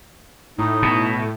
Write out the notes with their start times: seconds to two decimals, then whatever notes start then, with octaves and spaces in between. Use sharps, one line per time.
0.59 A2 D#4
0.82 B2